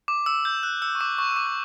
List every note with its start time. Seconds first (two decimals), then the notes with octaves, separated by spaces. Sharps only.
0.08 D6
0.26 E6
0.45 G6
0.63 F#6
0.82 E6
0.95 C#6
1.01 D6
1.18 C#6
1.31 E6
1.36 D6
1.47 F#6